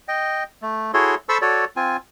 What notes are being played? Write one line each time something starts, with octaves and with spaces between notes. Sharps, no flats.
D#5 G5
A3
E4 F#4 G#4 A4 C#5 C6
A4 C5 A5 B5 C#6 E6
F#4 A4 C#5 D5
C4 F4 G#5